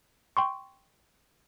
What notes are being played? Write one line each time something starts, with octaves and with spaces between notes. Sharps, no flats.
G5 C6 C#6